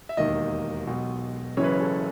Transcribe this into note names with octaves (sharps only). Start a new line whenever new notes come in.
E5
E1 D#2 D#3 D#5
B1 B2
F#1 F#2 C#3 E3 C#5
B4
C#5
A4